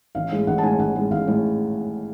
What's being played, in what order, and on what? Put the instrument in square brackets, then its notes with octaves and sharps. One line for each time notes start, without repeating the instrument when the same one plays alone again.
[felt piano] A1 F5
A2 G#3
A1 F#5
A5
A2 G#3 G#5
A1 F#5
A2 G#3
A1 F5
A2 G#3